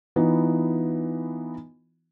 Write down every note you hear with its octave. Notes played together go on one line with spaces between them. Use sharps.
E3 B3 D#4 F4